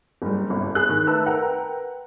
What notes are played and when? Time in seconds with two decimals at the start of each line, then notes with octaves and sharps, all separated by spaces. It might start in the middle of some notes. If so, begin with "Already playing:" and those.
0.22 F#1 G3
0.50 G1 C2
0.75 G#4 F#6
0.89 D#3
1.07 A3 D#4 B4 A5 E6
1.26 A#4 B4 F#5 G5 A#5